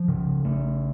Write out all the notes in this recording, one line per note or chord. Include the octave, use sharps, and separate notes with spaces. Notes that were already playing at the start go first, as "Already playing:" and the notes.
Already playing: F3
C#3
A3